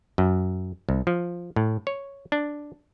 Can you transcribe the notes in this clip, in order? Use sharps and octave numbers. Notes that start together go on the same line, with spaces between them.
F#2
C2
F3
A2
C#5
D4